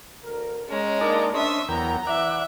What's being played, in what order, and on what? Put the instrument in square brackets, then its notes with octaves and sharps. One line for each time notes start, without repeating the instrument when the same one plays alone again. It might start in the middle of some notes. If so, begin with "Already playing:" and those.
[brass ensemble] D2 A#4
[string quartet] G#3 A#5 [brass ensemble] C#4
[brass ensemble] A#3 D4 A#4 [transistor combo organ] D#4 A5 D6
[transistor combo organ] C#4 C5 [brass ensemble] D4 [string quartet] E5 D#6
[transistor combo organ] E2 A#4 G5 [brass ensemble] F#3 B3 [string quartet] A#5
[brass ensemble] E3 [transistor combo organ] D5 F#5 [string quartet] E5